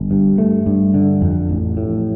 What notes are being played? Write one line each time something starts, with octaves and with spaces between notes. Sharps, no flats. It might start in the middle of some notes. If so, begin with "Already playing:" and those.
Already playing: G1
G2
A3
G2
D3
F2
A1
A2